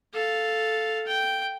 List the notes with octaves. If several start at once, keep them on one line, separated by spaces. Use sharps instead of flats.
A4 F5
G5